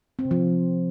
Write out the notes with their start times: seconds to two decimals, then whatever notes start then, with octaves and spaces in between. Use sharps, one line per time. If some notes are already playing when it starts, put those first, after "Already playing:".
0.19 C4
0.25 C3
0.31 F3